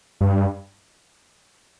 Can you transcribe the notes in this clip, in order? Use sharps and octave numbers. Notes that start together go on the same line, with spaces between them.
G2